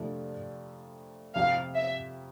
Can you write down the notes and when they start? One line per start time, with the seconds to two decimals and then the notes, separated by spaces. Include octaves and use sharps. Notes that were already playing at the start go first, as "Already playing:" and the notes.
Already playing: F2 C3 F3 A3 D4
1.35 F2 C3 F3 C4 G4 F5
1.75 E5